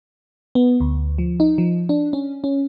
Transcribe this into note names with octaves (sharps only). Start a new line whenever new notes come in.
B3
D2
F3
D#4
F3
D4
C#4
C#4